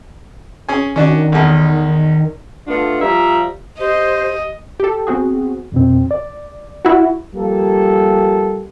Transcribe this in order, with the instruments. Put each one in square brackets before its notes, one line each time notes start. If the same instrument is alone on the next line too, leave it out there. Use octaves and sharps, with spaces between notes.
[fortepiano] C#4 G#4 G#5
[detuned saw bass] D#3 [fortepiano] C#4 D4 F#4
[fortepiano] B1 E2
[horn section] A3 B3 D4 F4
F3 G3 E5 A#5
[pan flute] G4 [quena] C5 [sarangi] D#5
[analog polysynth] G4 A4
B3 C4 F#4 G#4
[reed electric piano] F2 B2 C4
D5
[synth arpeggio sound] E4 F#4
[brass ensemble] F3 G3 A#3 G4 A4